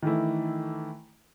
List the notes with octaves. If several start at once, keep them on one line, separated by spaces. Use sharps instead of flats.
D#3 E3 A3 E4